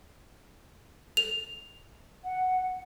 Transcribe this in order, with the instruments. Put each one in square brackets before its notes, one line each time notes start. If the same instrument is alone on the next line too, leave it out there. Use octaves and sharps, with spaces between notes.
[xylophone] F7
[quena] F#5